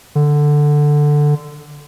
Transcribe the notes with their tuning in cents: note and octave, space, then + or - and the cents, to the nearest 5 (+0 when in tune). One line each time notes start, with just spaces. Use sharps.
D3 +5